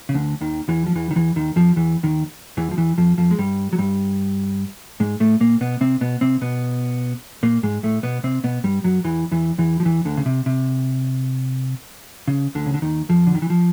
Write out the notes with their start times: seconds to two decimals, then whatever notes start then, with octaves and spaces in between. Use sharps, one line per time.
0.09 C#3
0.14 D2 D3
0.41 D#2 D#3
0.69 E2 E3
0.86 F3
0.95 E2 E3
1.11 D#3
1.16 E2 E3
1.36 D#2 D#3
1.56 F2 F3
1.76 E2 E3
2.03 D#2 D#3
2.57 E2 E3
2.71 F3
2.77 E2 E3
2.98 F2 F3
3.18 F2 F3
3.31 G#3
3.38 G2 G3
3.73 F#3
3.78 G2 G3
5.00 G#2 G#3
5.20 A2 A3
5.40 A#2 A#3
5.61 B2 B3
5.81 C3 C4
6.01 B2 B3
6.21 C3 C4
6.41 B2 B3
7.43 A#2 A#3
7.63 G#2 G#3
7.83 A2 A3
8.03 B2 B3
8.24 C3 C4
8.44 B2 B3
8.64 G2 G3
8.84 F#2 F#3
9.04 E2 E3
9.31 E2 E3
9.58 E2 E3
9.80 F3
9.85 E2 E3
10.05 D2 D3
10.17 C#3
10.26 C3
10.46 C3
12.28 C#3
12.55 D2 D3
12.66 C#3
12.74 D3
12.82 D#2 D#3
13.09 F2 F3
13.27 D3
13.35 D#3
13.42 E3
13.50 F3